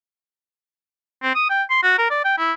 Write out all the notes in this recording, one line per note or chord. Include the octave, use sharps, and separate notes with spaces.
C4
D#6
G5
C6
F#4
A#4
D5
G5
E4